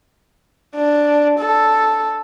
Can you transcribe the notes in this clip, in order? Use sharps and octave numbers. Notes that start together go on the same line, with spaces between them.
D4
A4